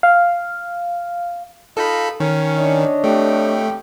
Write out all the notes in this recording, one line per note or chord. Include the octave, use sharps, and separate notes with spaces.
F5
D#4 F4 A4 B5
D#3 C#4
D4 C#5 D#5
F2 D3 A3 G4